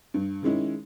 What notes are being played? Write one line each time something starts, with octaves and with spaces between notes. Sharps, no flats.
G2
D#3 G#3 C#4 E4